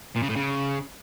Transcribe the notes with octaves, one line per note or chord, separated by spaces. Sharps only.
A#2
C#3
A2
C#3